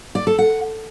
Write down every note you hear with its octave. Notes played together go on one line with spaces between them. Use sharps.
D5
A4
F#5